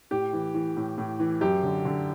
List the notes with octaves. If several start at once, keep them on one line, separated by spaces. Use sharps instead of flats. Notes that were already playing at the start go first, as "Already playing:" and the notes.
A2 G4
E3
E3
A2
A2
E3
F#2 G4
D3
D3